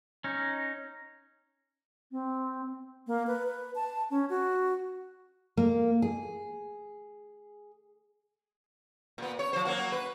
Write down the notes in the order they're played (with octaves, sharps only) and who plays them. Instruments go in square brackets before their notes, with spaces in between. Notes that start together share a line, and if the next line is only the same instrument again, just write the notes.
[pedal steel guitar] C#4 D#4
[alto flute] C4
A#3
B4
B4
A5
C#4
F#4
[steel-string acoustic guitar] A#3
G#4
[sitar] A#2 B3
C#5
F3 C5
F#3 A#3 F#4
B4